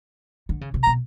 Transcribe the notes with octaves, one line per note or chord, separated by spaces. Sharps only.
D3
C#3
C3
A#5
B2